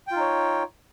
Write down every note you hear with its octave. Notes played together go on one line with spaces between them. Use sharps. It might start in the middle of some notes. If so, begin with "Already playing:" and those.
D#4 F4 C#5 G5